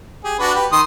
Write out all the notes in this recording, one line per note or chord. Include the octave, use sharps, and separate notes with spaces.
G4 G#4
D4 F#4 B4
G4 B4
D#3 C6 D#6